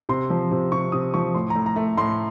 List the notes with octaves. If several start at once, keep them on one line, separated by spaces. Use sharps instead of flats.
C3 C6
F3
C3
C3 C#6
C3 D#6
F3 C#6
A2 C6
A2 A#5
A#5
A3
A2 C6